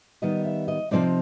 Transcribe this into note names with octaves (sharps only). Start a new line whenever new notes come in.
D#3 G3 B3 D#5
E5
D#5
C3 F3 A3 C4 D#4 D5